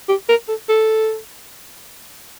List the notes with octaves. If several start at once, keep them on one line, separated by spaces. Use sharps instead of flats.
G4
A#4
A4
A4